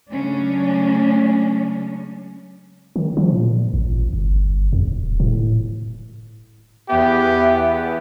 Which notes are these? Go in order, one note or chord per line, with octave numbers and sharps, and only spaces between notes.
C#3 F#3 G#3 A3 C#4 D4
D#3
F3
A#2
A1
G1
F2
D#1
A2
E2 B3 G4 E5